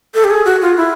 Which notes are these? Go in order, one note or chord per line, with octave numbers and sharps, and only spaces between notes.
A4
G4
G#4
F#4
F4
E4